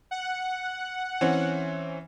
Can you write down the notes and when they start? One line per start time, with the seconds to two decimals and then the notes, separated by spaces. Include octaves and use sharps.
0.11 F#5
1.21 E3 C4 C#4